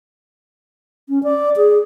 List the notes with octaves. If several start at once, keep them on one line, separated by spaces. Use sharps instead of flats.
C#4
D5
G#4